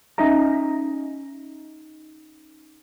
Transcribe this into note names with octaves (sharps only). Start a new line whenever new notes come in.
C#4 D#4 D#5 E5 A#5